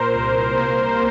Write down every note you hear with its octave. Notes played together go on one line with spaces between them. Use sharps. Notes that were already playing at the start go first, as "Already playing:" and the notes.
Already playing: A#2 A#4 C5
C2
A#3